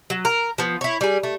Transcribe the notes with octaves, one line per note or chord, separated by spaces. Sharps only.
F#3
A#4
F3 B3
E4 C#5
G3 G#4
A3